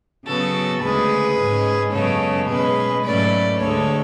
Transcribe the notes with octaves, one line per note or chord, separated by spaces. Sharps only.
C#3 F#3 B3 F#4 A4
D2 C#3 G#3 G#4 B4
G#2 G#3 C#4
F#2 C#3 G#3 B3 A4 C#5
B2 G#3 C#4 G#4 B4
G#2 F#3 A3 C#4 B4 D5
D2 D3 G#3 A4 C#5